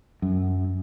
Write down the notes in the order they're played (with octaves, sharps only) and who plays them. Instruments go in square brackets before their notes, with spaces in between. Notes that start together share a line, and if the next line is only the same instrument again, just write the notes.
[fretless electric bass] F#2